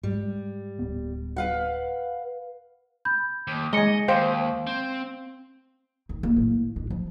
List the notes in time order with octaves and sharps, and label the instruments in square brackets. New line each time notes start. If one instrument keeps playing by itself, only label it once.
[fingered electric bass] G#2 [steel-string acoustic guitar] G3
[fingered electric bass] D1 B3
[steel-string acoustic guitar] B4 F5 F#5
[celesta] B5 G6
[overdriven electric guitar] D#2
[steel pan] G#3 G#5 [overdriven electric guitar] D#5 [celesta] A#6 C#7 G7
[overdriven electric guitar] D#2 [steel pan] C5 G5 [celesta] F5
[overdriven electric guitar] C4
[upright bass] D#3
A#3
A2
D4
F3